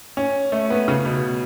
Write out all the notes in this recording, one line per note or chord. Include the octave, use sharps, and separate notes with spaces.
C#4
A3
B3
C#3
B2